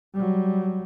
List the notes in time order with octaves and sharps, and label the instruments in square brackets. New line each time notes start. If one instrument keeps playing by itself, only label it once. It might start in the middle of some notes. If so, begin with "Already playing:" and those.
[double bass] F#3 G3